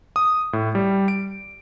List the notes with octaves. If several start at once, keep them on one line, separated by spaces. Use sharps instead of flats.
D#6
A2
G3
D7